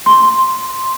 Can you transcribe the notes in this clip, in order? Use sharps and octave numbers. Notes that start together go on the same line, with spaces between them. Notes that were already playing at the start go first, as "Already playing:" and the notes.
C6